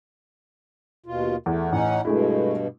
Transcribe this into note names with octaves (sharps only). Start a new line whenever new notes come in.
D#2 B2 F4
E2 A3
A1 C#4 D#4 F#5
G2 B2 G#3 A3 E4